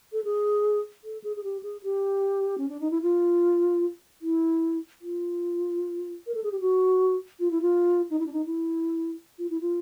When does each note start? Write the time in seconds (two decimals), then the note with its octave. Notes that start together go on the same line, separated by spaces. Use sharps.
0.13 A4
0.24 G#4
1.04 A4
1.24 G#4
1.36 G#4
1.44 G4
1.63 G#4
1.83 G4
2.58 C#4
2.69 D4
2.80 D#4
2.91 E4
3.02 F4
4.22 E4
5.01 F4
6.27 A#4
6.35 A4
6.44 G#4
6.52 G4
6.60 F#4
7.40 F4
7.51 E4
7.62 F4
8.10 D#4
8.19 E4
8.26 D4
8.33 D#4
8.46 E4
9.39 F4
9.50 E4
9.61 F4